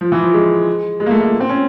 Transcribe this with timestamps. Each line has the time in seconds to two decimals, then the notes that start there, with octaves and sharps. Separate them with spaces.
0.01 F3
0.12 E3
0.23 F3
0.34 G#3
1.00 G#3
1.06 A#3
1.11 A3
1.22 A#3
1.40 C4
1.49 C#4